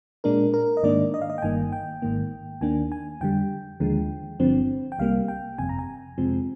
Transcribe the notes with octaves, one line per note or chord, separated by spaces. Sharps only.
A#2 G#3 D4 A#4
A#4
D#5
G#2 D#3 A#3 D4 D5
D#5
F5
D#5
G5
G1 G2 D#3 A#3 G#5
G5
G#1 G#2 D#3 A#3
D#2 D#3 A#3 D4 G#5
G#5
F2 D3 G3 G5
D#2 D3 F3 G#3
G1 G2 D3 F3 C4
G5
C2 C3 G3 A#3 F5
G5
G1 F2 C3 G#5
A#5
G#5
F2 C3 F3 G#3 C4